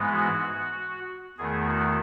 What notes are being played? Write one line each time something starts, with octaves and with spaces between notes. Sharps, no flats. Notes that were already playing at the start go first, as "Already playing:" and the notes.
Already playing: G#2 E3 G#3 B3
F#4
E2 D#3 A3 G#4
F#4